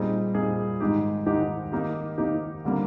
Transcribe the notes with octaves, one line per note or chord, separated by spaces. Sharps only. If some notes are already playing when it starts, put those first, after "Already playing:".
Already playing: A#2 G3 C4 D#4 G#4
A#2 G3 C4 D#4 G#4
G#2 D#3 G#3 D#4 G4
G#2 D#3 G#3 D#4 G4
D#3 A#3 D#4 G4
D#3 A#3 D#4 G4
D3 G3 A#3